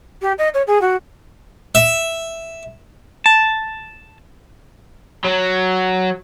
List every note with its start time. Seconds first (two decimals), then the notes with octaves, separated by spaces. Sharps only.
0.22 G4
0.38 D#5
0.54 C#5
0.67 G#4
0.82 F#4
1.75 E5
3.26 A5
5.25 F#3